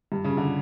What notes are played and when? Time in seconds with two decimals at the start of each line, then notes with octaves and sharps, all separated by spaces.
0.12 G2
0.24 C#3
0.37 D3